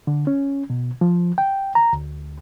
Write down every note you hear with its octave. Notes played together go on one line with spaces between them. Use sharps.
D3
C#4
B2
F3
G5
A#5
D2